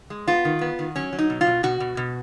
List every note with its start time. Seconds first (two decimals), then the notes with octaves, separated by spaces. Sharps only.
0.10 G#3
0.28 B3 F4
0.45 D#3
0.61 B3
0.79 D#3
0.96 F#3 C#4
1.13 F#3
1.19 D#4
1.30 B2
1.41 F4
1.47 B2
1.63 B2 F#4
1.80 B2
1.97 B2